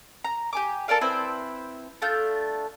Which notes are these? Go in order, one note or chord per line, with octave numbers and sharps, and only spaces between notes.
A#5
G4 G#5 D6
A4 A#4 D5 F5
C4 E4 B4 C5
A3 D4 F4 G6